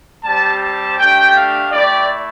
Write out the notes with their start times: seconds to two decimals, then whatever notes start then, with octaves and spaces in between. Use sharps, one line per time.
0.24 G3 C4 G4 A5
0.61 A5
0.98 A3 D4 G4 G5
1.35 F5
1.71 A3 E4 G4 D5